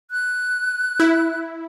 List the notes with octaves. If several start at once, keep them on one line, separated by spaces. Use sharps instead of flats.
F#6
E4